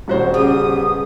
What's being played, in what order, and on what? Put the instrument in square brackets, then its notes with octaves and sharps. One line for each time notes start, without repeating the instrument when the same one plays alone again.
[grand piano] D#1 F#4 C5
[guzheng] C#3 [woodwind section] B3 G4 D#6